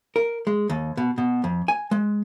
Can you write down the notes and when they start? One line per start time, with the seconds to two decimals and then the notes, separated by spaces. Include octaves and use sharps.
0.16 A#4
0.47 G#3
0.70 D#2
0.97 B2
1.18 B2
1.44 F2
1.68 G#5
1.91 G#3